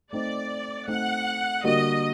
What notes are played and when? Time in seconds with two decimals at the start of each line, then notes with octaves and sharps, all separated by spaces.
0.12 A3 C4 D#4 D5
0.88 A3 C4 D#4 F#5
1.64 D3 G3 A#3 F#4 A#4 D#5